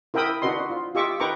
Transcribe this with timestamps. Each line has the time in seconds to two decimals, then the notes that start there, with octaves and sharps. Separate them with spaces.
0.14 E4 A#4 E5 G5 B5 D#6
0.42 D4 D#4 F#4 B4 D#5 C6
0.70 F4
0.95 F4 G4 D#5 E5 C#6 D6
1.20 D#4 B4 G5 A#5 C#6 D6